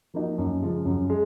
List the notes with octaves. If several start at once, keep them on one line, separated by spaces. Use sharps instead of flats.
F3 A#3 D#4 F#4
F#2
C#3 F3 G#3
F#2
G#3